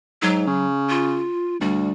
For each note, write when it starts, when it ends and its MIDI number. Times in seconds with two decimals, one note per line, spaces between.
0.22 0.43 44
0.22 0.66 54
0.47 1.25 49
0.89 1.57 65
1.61 1.92 38
1.61 1.92 55